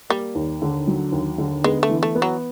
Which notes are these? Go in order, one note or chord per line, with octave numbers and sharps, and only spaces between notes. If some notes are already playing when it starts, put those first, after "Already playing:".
G3 A#3
D#2
D3
F#3
D#2
D3
G#3 B3
A3
E3
A3
B3
F#3